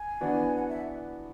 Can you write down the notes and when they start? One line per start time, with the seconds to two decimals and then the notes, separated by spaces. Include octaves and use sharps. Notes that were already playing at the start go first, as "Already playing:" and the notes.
Already playing: G#5
0.21 E3 B3 D4 F#4
0.56 F#5
0.69 E5